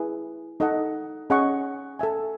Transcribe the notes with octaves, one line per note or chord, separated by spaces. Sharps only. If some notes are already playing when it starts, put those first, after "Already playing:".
Already playing: E4 G#4 B4
D#4 A4 D#5 F#5
C#4 G#4 D#5 F#5 C#6
A4 E5 G#5